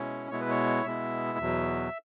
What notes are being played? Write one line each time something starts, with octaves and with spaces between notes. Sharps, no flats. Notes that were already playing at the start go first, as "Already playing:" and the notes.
Already playing: B2 G#3 C#4 E4 C#5
B2 G#3 B3 E4 C#5
B4
C#5
B2 G#3 B3 E4 E5
E2 B2 F#3